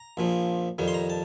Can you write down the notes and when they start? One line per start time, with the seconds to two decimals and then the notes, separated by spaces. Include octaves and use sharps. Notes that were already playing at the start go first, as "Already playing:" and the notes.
Already playing: A#5
0.17 A#1 A#2 F3
0.78 F2 D#3 G3
0.88 C6
0.94 A#5
1.10 A5